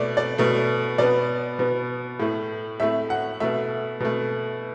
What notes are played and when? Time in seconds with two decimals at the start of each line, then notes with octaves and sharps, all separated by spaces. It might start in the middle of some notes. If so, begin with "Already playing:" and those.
Already playing: B2 A3 D5
0.17 D5
0.38 B2 A3
0.98 B2 B3 D5
1.59 B2 B3
2.20 A2 A3
2.80 A2 A3 E5
3.10 F#5
3.40 B2 A3 E5
4.00 B2 A3